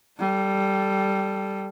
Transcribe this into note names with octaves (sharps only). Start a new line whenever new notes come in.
G3 A4